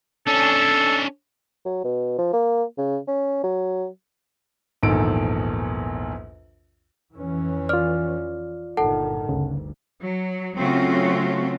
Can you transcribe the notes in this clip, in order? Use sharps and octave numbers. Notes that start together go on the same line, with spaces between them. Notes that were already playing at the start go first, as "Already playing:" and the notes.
C#4 D4 A4
F#3
B2
F3
A#3
C#3
C#4
F#3
A#1 E2 G#2 D#3 A4 D7
F2 E3 C#4
F4 D5 F6
G1 A#2 D#3 A4 F#5 A5
G1 D2 C#3
F#3
C#3 F#3 A3 C4 F4 F#4